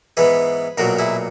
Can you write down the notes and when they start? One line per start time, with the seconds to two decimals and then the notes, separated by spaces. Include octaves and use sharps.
0.17 G#2 E3 B3 G#4 B4
0.78 B1 A#2 F#3 F#4 A#4
0.99 E4 G#4